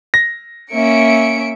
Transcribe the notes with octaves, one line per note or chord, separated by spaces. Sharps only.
A#6
A#3 C#4 E5 C#7 D7